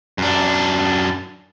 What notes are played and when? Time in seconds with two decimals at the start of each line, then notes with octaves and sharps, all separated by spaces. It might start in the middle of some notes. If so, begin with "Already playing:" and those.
0.18 F#2 D4